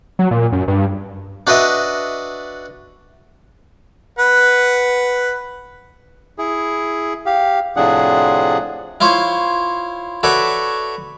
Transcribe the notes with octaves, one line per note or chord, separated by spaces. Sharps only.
F#3
A#2
F#2
G2
D4 F#4 B4 D#5 E5
B4 F#5
E4 G#4
G4 F5
A2 C3 F3 D4 G#4 F#5
E4 F4 C5 C#5
F#4 A4 B4 C#5 D5 E5